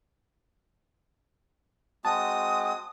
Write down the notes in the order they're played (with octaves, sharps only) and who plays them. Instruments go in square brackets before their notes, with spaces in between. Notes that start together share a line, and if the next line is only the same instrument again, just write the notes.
[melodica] G#3 C4 F#4 [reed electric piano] A5 [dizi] D#6